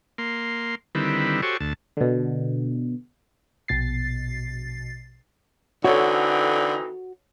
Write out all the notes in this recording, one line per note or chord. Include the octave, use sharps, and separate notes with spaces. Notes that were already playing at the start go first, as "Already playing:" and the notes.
A#3 C6
D3 D#3 G3 C4 E4 B4
F#4 G4 A4 C5 C#5 G#5
D2 A5
B2 D3
A#1 B2 A6 C7
D3 E3 C4 D#4 F#4 A4 C#5